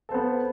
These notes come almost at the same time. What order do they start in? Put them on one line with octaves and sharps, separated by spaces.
A4 C5 B3